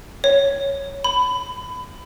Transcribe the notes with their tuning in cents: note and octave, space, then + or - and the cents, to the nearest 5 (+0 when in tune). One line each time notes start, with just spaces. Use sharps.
C#5 +5
B5 +25